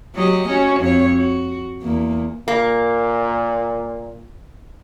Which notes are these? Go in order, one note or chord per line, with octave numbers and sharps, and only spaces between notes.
F#3 G4 D#5
C#4 F#4
F2 C#5
F#4
E2 A#3
A#2 A#3